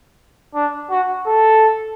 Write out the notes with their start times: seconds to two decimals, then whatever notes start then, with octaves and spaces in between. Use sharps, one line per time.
0.55 D4
0.91 F#4
1.26 A4